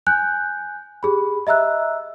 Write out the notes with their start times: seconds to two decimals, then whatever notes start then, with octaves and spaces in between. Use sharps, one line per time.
0.07 G#5 F#6 G6
1.03 G4 G#4 B5
1.47 D#5 E5 A#5 E6 F#6